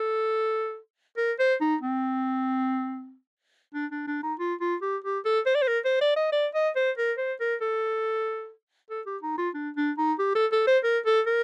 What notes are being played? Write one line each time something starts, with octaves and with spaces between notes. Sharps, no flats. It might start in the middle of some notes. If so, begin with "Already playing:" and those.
Already playing: A4
A#4
C5
D#4
C4
D4
D4
D4
D#4
F4
F4
G4
G4
A4
C5
D5
C5
A#4
C5
D5
D#5
D5
D#5
C5
A#4
C5
A#4
A4
A4
G4
D#4
F4
D4
D4
D#4
G4
A4
A4
C5
A#4
A4
A#4